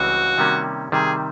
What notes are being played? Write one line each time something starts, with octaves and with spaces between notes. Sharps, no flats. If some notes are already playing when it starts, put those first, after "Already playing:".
Already playing: C#2 C#3 E3 G3 C4 F#4
C3 D#3 G3 A#3 C#4
C3 D#3 G3 G#4